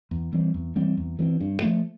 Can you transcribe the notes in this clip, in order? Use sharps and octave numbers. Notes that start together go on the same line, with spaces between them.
E2
E3 G3 C4
E2
E3 G3 C4
E2
E3 G3 C4
G2
F3 A3